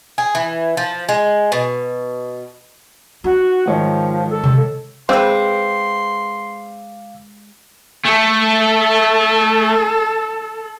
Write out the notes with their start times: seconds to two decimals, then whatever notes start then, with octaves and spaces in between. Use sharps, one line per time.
0.18 G#4
0.35 E3
0.77 F3
1.09 G#3
1.52 B2
3.24 D#4 F#4
3.67 G#2 D#3 F3 C#5
4.29 A4
4.44 C3
5.09 G#3 C4 B4 F5 C6 D6 E6
8.05 A3 A4